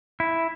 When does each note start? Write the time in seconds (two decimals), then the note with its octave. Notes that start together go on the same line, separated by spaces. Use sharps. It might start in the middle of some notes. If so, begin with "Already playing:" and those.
0.20 E4